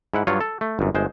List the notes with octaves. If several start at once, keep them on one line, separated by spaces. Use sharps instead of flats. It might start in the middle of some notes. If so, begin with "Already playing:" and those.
G#2 E4 F#5
G2 F#3 G3 F4 C#5
A4
A3
G1 F#2
G1 G#3 C5